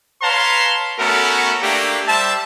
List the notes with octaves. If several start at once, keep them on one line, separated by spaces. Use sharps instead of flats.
B4 C#5 F5 A5 A#5 C6
A3 B3 C#4 F#4 A4 A#4
A3 A#3 D4 G4
G3 C5 E5 A5